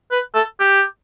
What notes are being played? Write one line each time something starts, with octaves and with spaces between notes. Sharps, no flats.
B4
A4
G4